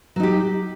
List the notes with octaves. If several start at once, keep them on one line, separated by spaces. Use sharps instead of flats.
F#3 D#4 G4